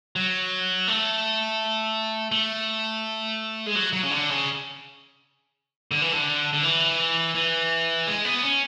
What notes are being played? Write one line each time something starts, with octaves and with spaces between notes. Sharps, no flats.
F#3
A3
A3
G#3
F#3
F#3
C#3
D3
C#3
D3
E3
D3
D3
E3
E3
G#3
B3
C#4